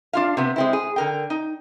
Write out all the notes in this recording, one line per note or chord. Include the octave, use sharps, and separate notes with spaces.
D4 F4 F5
C3 B3
G#3 C4 E4
G#4
D3 A#4 G5
D#4